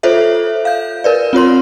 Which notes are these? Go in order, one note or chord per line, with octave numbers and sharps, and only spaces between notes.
F4 A4 C5 C#5 E5
F5 G6
A#4 B4 D5
C4 F4 C#5 C6